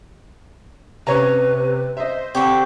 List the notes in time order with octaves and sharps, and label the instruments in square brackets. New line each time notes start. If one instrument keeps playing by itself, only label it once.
[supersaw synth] C3 [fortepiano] C#4 C#5 A#5 [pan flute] B4
[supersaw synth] C5 [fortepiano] D#5 E5
[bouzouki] D3 G4 [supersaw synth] C4 [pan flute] C#6